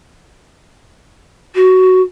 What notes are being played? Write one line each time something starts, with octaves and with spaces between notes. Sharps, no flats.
F#4